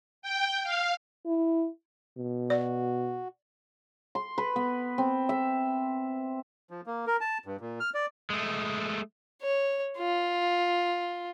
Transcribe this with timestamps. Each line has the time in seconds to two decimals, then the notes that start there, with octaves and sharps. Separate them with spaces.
0.22 G5
0.64 F5
1.26 E4
2.17 B2
2.50 F#4 D5
4.15 C6
4.38 B4
4.56 B3
4.98 C4
5.29 E5
6.71 F3
6.86 A#3
7.07 A#4
7.21 A5
7.46 G2
7.61 A#2
7.80 F6
7.94 D5
8.30 G#3 A3
9.42 C#5
9.98 F4